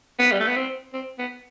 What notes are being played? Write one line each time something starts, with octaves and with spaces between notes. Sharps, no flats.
B3
G3
A3
B3
C4
C4
B3